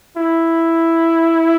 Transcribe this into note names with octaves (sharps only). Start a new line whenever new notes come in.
E4